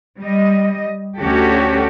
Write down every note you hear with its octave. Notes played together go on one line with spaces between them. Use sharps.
G3 D#5
D2 C#4 F#4 G4 A4